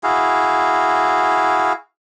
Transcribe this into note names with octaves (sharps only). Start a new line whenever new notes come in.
E4 F#4 G#4 F5